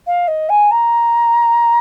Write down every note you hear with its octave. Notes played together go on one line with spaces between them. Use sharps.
F5
D#5
G#5
A#5